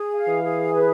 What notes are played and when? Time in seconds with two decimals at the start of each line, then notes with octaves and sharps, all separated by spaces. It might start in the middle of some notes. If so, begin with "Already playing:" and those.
Already playing: G#4
0.14 F5
0.28 E3
0.43 G#4
0.73 B4